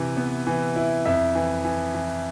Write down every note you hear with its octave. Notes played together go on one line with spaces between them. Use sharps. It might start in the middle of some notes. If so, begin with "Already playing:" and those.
Already playing: C3 E3 E4
B3
E3
E4
F2 E5
E3
E3
E3